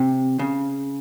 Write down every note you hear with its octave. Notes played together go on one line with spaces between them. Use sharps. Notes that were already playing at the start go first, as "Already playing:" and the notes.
Already playing: C3
C#3